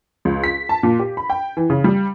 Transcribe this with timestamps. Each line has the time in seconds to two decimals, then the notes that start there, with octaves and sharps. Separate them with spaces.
0.25 C#2
0.44 B6
0.69 A5
0.83 A#2
0.99 G4
1.17 B5
1.30 G5
1.57 E3
1.70 C#3
1.84 G3